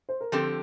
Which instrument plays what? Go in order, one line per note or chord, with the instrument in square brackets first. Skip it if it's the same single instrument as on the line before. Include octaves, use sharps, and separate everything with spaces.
[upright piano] C5
A#4
[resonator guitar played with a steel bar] D3 F3 C4 G4 [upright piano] A4